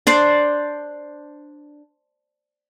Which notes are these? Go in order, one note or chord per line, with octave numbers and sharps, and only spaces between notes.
D4 C5 D5